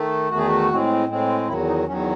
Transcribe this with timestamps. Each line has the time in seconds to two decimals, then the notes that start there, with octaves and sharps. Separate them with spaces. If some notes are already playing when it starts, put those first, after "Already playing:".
Already playing: D#3 A3
0.29 E2 D#3 A3 F#4
0.38 G#4
0.47 F#4
0.69 A2 G#3 C4
1.08 A2 G#3 C4
1.47 E2 D#3 F#3 E4
1.67 D#4
1.87 E2 D#3 F#3 C#4